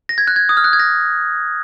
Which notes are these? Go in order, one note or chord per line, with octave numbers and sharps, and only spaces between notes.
A#6
G#6
F#6
G#6
D#6
F6
F#6
G#6
A#6